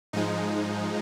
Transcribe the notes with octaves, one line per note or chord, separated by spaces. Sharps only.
G#2 F3 G#3 D#4